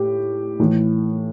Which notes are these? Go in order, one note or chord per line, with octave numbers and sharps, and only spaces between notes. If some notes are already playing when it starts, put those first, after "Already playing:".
Already playing: A2 G4
A2 E3